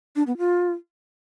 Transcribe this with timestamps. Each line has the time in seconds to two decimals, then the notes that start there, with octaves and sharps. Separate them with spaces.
0.16 D4
0.27 B3
0.38 F4